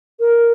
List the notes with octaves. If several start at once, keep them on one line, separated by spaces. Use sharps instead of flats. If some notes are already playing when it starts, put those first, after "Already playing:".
A#4